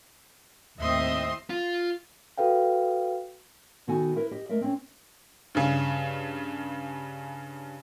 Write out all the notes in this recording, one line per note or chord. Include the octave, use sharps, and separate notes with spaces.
D#2 A2 C4 D#5 E5 C6 D#6
F4
F#4 A4 B4 F5 G5
B2 D#3 B3 F#4 A4 G#5
E4 A#4 B4
G4 D#5
A3 A#4 D#5 E5
C4 C#4
G2 C#3